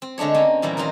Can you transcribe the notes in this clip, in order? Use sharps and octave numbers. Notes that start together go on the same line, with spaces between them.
C4
D3 G#3 A3 D4 C#5
A#3 C4 C#4
A#2 E3 F#3 G3 A#3
D#3 F#3 C4 F4 C5